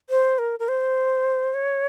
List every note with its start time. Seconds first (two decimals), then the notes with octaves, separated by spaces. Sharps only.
0.10 C5
0.39 A#4
0.59 A#4
0.68 C5
1.54 C#5